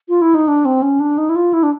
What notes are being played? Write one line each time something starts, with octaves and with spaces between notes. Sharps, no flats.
F4
E4
D#4
D4
C4
C#4
D4
D#4
E4
F4
E4
D4